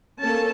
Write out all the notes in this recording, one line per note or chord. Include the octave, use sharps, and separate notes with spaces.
A#3 C#4 A4 A5